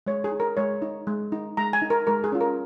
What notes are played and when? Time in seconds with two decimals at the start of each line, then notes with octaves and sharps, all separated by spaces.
0.06 G#3 C#5
0.24 G#4
0.32 D#4
0.40 A#4
0.57 G#3 C#5
0.82 D#4
1.07 G#3
1.32 D#4
1.57 G#3 A#5
1.73 G#5
1.82 D#4
1.90 A#4
2.07 G#3 A#4
2.24 G#4
2.32 C#4 F4
2.41 A#4